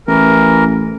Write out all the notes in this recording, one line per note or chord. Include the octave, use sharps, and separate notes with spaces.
A1 E3 A#4